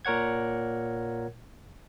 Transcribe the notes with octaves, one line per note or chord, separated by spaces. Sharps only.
A#2 A#4 C#5 F#5 G#6